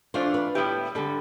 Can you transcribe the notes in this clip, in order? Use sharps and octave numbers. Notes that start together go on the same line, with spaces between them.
E3 A3 D4 F4 C5
B4
A2 G3 B3 E4 G4
D3 G3 A4